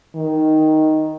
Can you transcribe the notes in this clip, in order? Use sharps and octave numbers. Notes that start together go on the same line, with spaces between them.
D#3